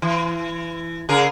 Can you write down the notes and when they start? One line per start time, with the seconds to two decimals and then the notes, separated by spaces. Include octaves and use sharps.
0.02 E3
1.09 C#3 G#4 A#4